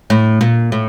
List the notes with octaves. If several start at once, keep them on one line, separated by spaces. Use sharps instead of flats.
A2
A#2
A2